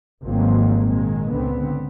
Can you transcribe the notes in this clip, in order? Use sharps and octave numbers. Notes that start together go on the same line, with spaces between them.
G#1 F3 F#3 G#3 A#3 C4
A#2 D#3 G#3
C#2 D3 B3 C4